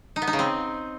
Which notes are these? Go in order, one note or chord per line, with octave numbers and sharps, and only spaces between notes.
D#4
B3
D#4
C#3
C4